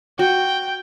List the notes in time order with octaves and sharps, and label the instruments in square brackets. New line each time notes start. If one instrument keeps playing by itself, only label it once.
[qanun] F#4 [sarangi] G5